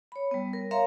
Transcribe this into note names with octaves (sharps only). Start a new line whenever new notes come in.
C#5 B5
G3 B3
A#4
A#4 C#5 E5 F5 A#5 C6